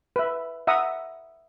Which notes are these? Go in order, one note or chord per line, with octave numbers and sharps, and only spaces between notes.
B4 E5
E5 F#5 A#5 D#6